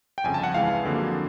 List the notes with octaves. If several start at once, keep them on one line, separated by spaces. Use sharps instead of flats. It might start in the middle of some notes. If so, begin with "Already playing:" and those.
G5
G1 F2 C#3 G#5
A5
F#5
C#2 C#3 E3 G#3 F5
F2 D3 F#3 A#3